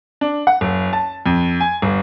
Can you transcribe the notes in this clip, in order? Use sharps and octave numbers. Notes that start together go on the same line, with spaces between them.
D4
F#5
F#1
A5
F2
G#5
G1